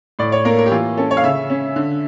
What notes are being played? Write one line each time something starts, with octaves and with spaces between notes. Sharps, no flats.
A2 D5
C#5
A#3 A#4
A#4
G4
E3 F4
C#4 A4
C#5
F5
C#3 E5
C#4
D3